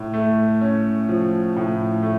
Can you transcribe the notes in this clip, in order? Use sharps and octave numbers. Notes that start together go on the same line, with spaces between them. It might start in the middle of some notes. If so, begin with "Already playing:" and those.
Already playing: A2
A3
C#4
F3
A2
A3